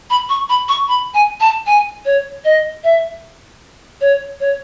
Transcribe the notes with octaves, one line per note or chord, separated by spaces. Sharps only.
B5
C#6
B5
C#6
B5
G#5
A5
G#5
C#5
D#5
E5
C#5
C#5